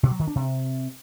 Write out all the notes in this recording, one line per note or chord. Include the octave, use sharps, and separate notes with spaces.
B2
F#3
D#3
D4
C3